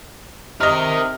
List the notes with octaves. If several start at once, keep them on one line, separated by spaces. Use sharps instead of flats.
C3 D#4 A#4 D#5 F6